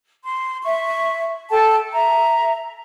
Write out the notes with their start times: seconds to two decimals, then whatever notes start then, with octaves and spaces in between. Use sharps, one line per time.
0.24 C6
0.64 E5 C#6
1.50 A4 G5 A5
1.94 E5 A#5